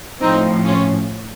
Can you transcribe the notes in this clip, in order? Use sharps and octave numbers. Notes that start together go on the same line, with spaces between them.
A2 F3 C4 D#4
C#4 F4